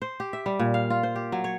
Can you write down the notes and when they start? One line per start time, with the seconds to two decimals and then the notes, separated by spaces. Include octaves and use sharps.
0.02 C5
0.20 G4
0.33 E5
0.46 G3
0.59 A#2
0.74 F5
0.90 F4
1.03 C5
1.16 G4
1.32 F#3
1.44 C#5